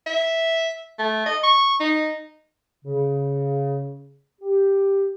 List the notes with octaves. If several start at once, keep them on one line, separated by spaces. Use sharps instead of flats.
E5
A3
D#5
C#6
D#4
C#3
G4